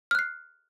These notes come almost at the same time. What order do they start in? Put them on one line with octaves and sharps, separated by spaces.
F6 F#6 C7